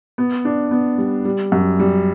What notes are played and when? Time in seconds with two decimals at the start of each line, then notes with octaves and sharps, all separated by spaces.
0.18 B3
0.45 D4
0.71 B3
0.98 G3
1.25 G3
1.52 F#2
1.79 G3